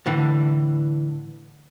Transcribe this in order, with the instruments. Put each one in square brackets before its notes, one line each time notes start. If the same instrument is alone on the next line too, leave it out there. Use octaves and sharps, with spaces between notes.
[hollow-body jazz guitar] A2 D3 E3